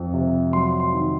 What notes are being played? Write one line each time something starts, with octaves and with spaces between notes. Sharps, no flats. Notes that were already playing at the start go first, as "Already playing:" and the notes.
Already playing: F2
C3
F#3 C6
C6
D#3